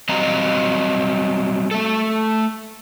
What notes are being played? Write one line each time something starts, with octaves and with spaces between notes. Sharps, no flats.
F#3 G3 C4 D#5 F5 A#5
A3 A4